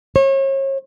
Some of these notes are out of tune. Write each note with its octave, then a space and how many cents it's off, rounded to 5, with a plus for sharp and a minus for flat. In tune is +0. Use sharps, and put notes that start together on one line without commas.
C#5 -35